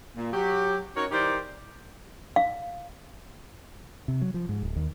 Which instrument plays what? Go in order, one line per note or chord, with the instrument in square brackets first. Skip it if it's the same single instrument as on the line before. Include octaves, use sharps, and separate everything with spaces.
[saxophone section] A#2
F#3 G4
C#4 D#4 F#4 A#4 C#5
E3 D#4 G4 A#4 C5 D5
[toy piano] F5
[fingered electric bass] C3
F#3
F3
G#2
D1
D#2